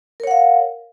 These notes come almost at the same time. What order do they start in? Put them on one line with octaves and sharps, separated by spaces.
A#4 C#5 F#5 F5